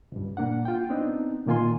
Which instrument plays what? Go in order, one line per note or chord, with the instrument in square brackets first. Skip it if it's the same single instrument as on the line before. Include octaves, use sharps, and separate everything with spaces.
[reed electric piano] C#2 G2
A#2 A#3 D4 F#5
F4 G5
B3 C4 D4 D#4
A#2 D#3 A#3 F4 G#5 C6